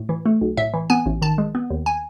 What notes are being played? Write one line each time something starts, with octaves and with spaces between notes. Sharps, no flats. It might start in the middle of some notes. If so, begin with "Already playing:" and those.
Already playing: A2
E3
A3
B1
A2 E5
E3
B3 G#5
A1
D#3 A5
G#3
B3
D#2
G#5